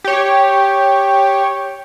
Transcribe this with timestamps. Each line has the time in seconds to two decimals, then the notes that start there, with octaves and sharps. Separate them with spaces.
0.05 G4 C#5